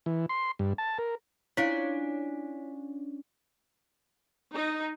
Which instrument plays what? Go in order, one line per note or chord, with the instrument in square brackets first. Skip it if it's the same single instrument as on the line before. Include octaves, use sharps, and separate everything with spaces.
[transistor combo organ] E3
C6
G2
A5
A#4
[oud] C#4 D4 F4 [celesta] E4 C#5 B6
[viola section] D#4